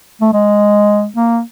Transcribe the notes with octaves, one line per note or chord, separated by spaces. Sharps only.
A3
G#3
A#3